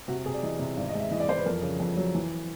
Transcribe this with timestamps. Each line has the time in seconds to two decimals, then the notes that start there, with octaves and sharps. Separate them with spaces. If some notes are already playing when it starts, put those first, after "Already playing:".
0.08 C3 F#4
0.26 C3 G#4
0.34 D5
0.43 E3 D#5
0.59 C3
0.77 G#1 D5
0.89 D#5
0.95 G#3
1.00 E5
1.11 E3 D#5
1.20 D5
1.28 E3 C5
1.37 B4
1.45 F2 A#4
1.63 C#3
1.80 F2
1.97 F#3
2.15 E3